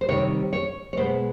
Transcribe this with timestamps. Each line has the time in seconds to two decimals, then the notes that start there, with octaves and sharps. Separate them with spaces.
0.01 C5
0.08 C3 D#3 G3 C4 C#5
0.53 C#5
0.93 C#5
0.97 B2 G#3 B3 C5